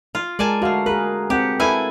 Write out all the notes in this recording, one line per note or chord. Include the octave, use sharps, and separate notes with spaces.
F4
G#3 A#4 D5 G#5 A5
D3 A3 F#4 F5
G#4 A#4 B4
C4 G4 A#4 F#5
E4 A4 B4 F5 G#5